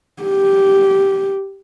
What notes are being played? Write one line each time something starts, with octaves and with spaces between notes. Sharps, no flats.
G4